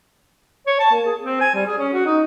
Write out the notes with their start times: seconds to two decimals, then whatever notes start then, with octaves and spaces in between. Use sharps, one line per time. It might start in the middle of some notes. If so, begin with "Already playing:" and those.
0.67 C#5
0.79 A5
0.91 A#3
1.05 G#4
1.21 C4
1.41 G#5
1.55 G3
1.66 G#4
1.78 C#4
1.93 F#4
2.06 D#4